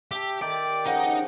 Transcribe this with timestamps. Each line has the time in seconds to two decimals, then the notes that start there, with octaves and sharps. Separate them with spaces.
0.11 G4 E5 G5 A5
0.42 D#3 G4 D5 G5
0.86 C#3 F3 D#4 C5 F#5